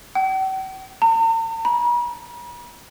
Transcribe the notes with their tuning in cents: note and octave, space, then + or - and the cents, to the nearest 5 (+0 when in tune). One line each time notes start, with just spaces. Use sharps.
G5 -45
A#5 -45
B5 -45